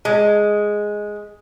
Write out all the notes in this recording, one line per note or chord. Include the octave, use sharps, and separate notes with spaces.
G#3